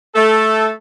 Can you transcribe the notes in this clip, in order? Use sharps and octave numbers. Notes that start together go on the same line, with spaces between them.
A3 A4